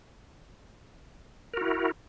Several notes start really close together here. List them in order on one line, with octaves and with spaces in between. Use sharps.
A#4 F#4 E4